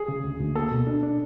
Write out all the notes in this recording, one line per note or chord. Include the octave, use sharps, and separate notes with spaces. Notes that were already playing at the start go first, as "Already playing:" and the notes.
Already playing: G#4
C#3
D2
D2
A#3 A4
B2
D4
D4